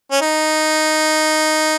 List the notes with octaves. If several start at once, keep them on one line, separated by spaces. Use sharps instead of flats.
C#4
D#4